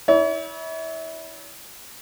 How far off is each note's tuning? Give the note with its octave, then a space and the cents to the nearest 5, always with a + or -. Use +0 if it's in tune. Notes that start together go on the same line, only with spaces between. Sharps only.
E4 -30 C#5 +40